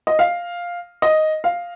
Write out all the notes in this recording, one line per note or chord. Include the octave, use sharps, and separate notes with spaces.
D#5
F5
D#5
F5